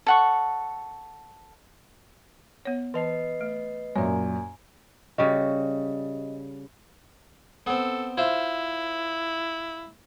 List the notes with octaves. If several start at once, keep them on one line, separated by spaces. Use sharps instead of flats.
A4 F#5 C#6
B3 C#5
E3 B4 D#5 A5 C7
A3
F#2 A#2 C#5 E5 G#5
C#3 G3 F#4 D#5
B3 C4 A4
E4 F4 C5 E5